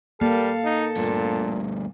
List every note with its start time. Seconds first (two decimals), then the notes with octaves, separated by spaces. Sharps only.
0.21 G3 A#3 A4 F5
0.65 D#4
0.97 D2 G2 A#2